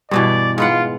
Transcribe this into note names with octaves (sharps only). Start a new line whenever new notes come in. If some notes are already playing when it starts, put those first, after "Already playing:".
G2 B2 E3 D5
G#2 F4 B4 F#5